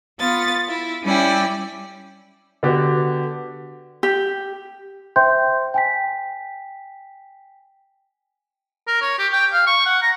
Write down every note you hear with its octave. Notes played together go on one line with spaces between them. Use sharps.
B3 F4 A6
E4
G3 C#4 E4 D5 G5
D3 B3 F#4 G4
G4
C5 E5 G5 C6 G6
G5 G#5 B6
A#4
C#5
G4
G5
F5
C#6
F#5
A#5